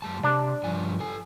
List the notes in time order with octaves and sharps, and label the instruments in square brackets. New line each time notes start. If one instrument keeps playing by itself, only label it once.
[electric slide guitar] F#2 G#3 A5
[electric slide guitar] C3 [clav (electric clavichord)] D4 D5
[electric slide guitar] G2 F3 G#5
A4 G#5